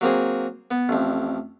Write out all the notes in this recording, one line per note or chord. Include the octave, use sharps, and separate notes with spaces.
F#3 A#3 C4 G#4
B3
A1 F2